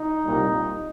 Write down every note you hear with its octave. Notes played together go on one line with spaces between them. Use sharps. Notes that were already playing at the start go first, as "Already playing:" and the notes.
Already playing: D#4
C2 A#2 G3